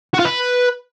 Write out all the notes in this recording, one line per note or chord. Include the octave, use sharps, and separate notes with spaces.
F#4
F4
B4